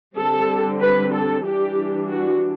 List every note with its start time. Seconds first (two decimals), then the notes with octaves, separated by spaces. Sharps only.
0.16 D3 G3 C4 A4
0.80 B4
1.13 A4
1.45 E3 G3 D4 G4
2.09 F#4